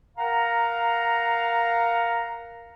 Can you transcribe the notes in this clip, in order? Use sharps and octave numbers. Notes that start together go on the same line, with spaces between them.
A#4 F5 F#5 A#5